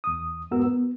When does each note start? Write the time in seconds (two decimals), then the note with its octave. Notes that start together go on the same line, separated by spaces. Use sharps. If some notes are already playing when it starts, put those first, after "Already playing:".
0.04 E2 D#6
0.51 E2 G#2 B3 F#4 A#4 E6
0.65 B3